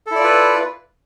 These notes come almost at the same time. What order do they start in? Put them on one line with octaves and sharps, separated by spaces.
A4 E4 D5 F4 B4